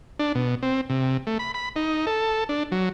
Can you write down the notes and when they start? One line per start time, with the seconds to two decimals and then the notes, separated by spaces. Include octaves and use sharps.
0.19 D4
0.35 B2
0.63 C4
0.90 C3
1.27 A3
1.39 B5
1.54 B5
1.76 D#4
2.07 A4
2.49 D4
2.72 F#3